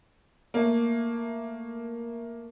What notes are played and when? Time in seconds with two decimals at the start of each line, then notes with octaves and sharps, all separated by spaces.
0.54 A3 A#3